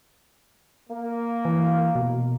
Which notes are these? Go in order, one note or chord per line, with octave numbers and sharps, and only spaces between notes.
A#3
E3
B2